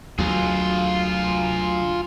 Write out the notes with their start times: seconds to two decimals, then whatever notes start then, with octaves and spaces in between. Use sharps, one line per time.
0.19 D2 F#3 F4 G#4